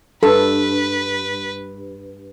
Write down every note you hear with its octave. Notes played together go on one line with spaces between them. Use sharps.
G2 A4 B4